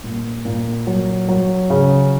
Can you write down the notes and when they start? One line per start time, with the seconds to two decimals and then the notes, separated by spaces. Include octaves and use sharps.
0.04 A#2
0.45 A#2
0.87 F#3
1.28 F#3
1.70 C#3